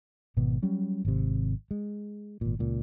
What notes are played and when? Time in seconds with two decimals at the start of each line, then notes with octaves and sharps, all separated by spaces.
0.37 G#1 B2 B3
0.63 F#3 G3 C#4
1.05 G#1 C3
1.71 G#3
2.41 G#1 A#2
2.59 C#2 A#2